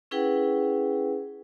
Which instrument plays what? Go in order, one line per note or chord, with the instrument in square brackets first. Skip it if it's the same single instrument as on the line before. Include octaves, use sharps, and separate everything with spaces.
[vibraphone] C#4 E4 G#4 B4 F#5 G5